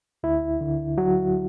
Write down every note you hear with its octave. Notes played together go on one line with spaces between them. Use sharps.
D2 E4
D3
F#3 F#4